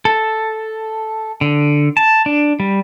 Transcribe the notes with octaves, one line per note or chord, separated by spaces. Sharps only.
A4
D3
A5
D4
G3